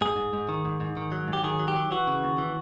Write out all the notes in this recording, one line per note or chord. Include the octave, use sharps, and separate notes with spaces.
G#2 G#4
G#2
G#2
D#3
G#2
G#2
D#3
F#3
G#2
G4
D#3 G#4
F#3
G4
F#3
E3 F#4
C#3
D#2
E3